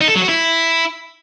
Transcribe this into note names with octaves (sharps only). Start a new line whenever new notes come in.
D#4
A4
F#3
F#4
E4